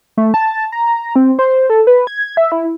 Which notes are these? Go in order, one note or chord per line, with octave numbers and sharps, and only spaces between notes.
A3
A5
A#5
C4
C5
A4
B4
G#6
E5
E4